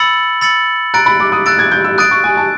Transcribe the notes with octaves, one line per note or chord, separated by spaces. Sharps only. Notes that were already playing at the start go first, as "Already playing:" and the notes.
Already playing: B5 E6 A6 C#7 F#7
B5 E6 A6 C#7 F#7
A#5 F#6 A6 D7
B5
D6
D#6
E6 F#6 A6 D7
G#6
G6
E6
D#6 F#6 A6 D7
C#6
G#5
A5